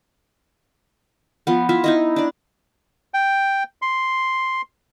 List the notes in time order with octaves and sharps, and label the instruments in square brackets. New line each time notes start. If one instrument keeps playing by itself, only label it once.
[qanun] F3 B3
E4 F4 E5
D#4 E4 D#5
D4 D5
[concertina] G5
C6